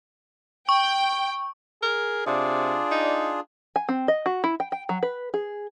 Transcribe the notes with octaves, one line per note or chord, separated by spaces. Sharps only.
G5 C#6
G#4 A#4
C3 D4 F4 G#4 D5
D#4
G#5
C4
D#5
F#4
E4
G5
G5
F#3
B4
G#4